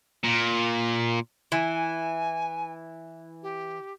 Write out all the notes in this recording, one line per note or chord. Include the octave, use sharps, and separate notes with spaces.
A#2
E3 G#5
G4